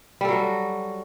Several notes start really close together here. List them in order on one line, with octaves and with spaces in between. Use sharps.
G3 A4 F#3 F#4